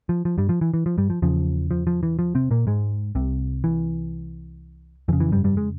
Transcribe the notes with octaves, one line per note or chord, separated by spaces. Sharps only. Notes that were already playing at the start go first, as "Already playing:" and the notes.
F3
F3
G2 G3
F3
E3
E3
F3
G2 G3
F3
E2 C#3 F3
F3
F3
E3
F3
C3 C4
A#2 A#3
G#2 G#3
C2 C3
E3
F2 C#3 E3
E3
G2 G3
G2 G3
G#3